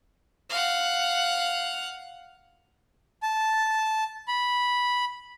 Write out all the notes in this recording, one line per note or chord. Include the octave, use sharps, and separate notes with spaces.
F5 F#5
A5
B5